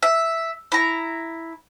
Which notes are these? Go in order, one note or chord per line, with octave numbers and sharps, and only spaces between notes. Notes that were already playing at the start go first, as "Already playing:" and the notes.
E5
E4 A#5